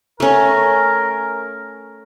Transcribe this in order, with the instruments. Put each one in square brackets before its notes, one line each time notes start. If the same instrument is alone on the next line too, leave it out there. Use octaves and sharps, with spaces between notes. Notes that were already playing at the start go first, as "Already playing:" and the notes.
[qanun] A3 C#4 [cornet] A#4